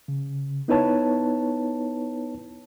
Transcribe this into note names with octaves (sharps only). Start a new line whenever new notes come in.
C#3
B3 D#4 E4 B4 C#5 A5